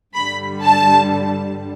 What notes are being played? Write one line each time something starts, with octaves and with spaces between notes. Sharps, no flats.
G2 D3 G3 B5
A5